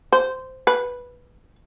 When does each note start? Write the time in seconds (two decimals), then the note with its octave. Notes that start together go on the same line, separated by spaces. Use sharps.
0.12 C5
0.67 B4